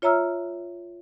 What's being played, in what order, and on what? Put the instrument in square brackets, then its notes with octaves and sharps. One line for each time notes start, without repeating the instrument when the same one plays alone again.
[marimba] F4 C#5 E5 A#5 E6 F6